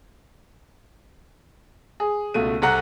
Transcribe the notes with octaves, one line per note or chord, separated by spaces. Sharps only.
G#4
C#2 B2 A3 D#7
C2 A4 F#5 A#5 F#6